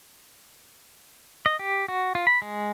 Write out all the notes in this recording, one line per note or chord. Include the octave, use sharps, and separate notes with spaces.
D#5
G4
F#4
F4
B5
G#3